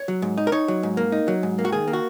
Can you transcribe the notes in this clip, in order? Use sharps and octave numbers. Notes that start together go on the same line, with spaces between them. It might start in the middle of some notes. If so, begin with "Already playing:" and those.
Already playing: C#5
F#3
G#2
D#4
A#4
D#4 C#5
F#3
G#2
A#3
D#4
F#3
G#2
A#3
F#4
D#3 G#4
A#3
F#4